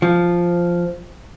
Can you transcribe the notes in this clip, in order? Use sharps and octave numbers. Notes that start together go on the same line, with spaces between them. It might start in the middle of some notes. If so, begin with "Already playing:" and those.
F3